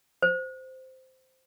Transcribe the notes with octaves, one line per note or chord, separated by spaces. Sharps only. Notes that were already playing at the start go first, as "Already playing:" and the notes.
C5